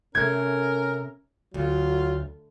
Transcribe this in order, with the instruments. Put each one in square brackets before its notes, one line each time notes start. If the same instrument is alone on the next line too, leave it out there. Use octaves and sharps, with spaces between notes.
[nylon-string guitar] C3 A3 [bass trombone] C#4 [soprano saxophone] A#4 [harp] G#6
[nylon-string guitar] D2 [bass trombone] F#3 [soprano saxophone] F4